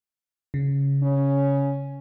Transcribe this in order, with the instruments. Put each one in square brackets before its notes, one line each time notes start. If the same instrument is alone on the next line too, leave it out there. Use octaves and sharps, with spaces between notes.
[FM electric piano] C#3
[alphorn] C#4